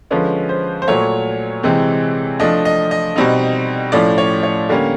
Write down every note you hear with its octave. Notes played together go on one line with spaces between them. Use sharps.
D3 F3 G#3 C#4 B4
C5
C5
A#2 F#3 A3 C#5
C3 E3 G#3 C4
F3 A3 D4 D#5
D#5
D#5
B2 G3 C4 D#4
A2 F3 A3 C#4 D5
C#5
C#5
D3 G3 A#3 C#4